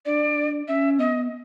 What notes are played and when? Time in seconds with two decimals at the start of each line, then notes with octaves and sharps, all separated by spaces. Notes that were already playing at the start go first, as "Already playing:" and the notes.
0.06 D4 D5
0.68 C#4 E5
0.99 B3 D#5